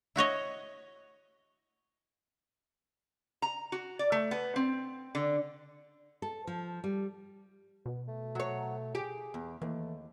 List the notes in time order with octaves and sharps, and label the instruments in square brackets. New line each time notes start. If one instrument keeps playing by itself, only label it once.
[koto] E4 F#4 C#5 D#5
[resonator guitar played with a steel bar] A#5
F#4
D5
A3
B3
C4
D3
[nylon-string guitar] A4
F3
G3
[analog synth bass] B2 [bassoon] B3
[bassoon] A3
[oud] F#3 C#5
[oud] G4 [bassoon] G#4
[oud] E2
[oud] D#2 [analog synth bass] E3 [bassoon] A3